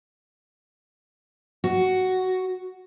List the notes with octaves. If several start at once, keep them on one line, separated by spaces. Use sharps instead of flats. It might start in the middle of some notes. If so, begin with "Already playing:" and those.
F#4